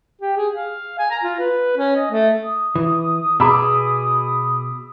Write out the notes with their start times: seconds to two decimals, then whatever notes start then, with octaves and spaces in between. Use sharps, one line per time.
0.21 G4
0.37 G#4
0.53 F5
0.99 G#5
1.11 A#5
1.23 F4
1.39 B4
1.77 C#4
1.96 D#5
2.11 A3
2.43 D#6
2.75 E3
3.40 B2 G#4 B5 D6 E6